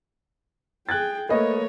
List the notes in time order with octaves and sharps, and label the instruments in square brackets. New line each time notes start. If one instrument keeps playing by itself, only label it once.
[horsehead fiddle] G#4 G5 [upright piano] F#6 G#6 A6
[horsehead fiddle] A3 C#5 [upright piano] A#3 B4 D#5